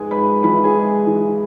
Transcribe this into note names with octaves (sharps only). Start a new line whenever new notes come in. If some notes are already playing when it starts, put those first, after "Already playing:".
Already playing: G#2 G#3 G#4 B4 G#5
G#2 B4 B5
E3 B4 B5
G#4 G#5
G#3
E3